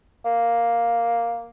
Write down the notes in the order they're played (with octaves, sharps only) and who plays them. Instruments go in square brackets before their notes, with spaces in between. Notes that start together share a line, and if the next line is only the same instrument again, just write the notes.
[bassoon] A#3